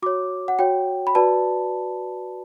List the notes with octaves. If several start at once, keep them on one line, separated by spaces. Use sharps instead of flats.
F#4 C#5 D6
F#5
F#4 C#5 G5
B5
F#4 B4 D5 A5